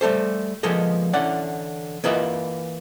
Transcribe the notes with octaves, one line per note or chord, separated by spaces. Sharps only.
G3 A3 A4 C5
F3 G#3 A#3 B3 A4 D#5
D3 E3 C#4 D5 F#5
E3 A#3 F4 B4 D#5 E5